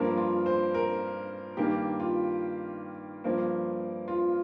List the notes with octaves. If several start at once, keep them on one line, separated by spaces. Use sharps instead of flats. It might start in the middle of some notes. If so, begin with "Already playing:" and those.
Already playing: G2 F3 A#3 A#4
F4
C5
A#4
G2 D#3 A#3 G4
F4
G2 F3 A#3
F4